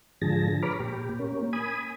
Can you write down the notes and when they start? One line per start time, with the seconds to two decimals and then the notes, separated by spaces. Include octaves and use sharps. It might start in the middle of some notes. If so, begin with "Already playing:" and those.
0.22 G#2 D3 F3 G#4 A5 A#6
0.63 B4 C#5 A#5 B5 D6 F6
0.80 A#2 G4
1.19 A#3 C#4
1.53 G#5 B5 D#6